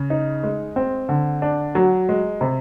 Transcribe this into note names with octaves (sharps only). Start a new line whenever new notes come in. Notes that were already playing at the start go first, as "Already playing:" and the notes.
Already playing: C#3
D#4
G#3
C4
D3
D4
F#3
G#3
C3